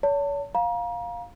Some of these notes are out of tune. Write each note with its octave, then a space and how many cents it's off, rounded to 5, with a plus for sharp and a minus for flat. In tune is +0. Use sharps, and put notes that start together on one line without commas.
C#5 +40 A5 +30
F5 +10 A#5 +30